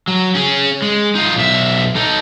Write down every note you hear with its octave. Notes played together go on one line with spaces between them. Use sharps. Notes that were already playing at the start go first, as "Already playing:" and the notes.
F#3
C#4 G#4
G#3
D#4 F4
B1 E5
D#4 A4